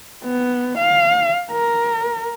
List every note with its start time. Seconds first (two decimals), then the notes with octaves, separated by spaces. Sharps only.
0.24 B3
0.78 F5
1.51 A#4